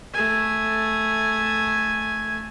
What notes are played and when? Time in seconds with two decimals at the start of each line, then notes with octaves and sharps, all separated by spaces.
0.14 A3 G#5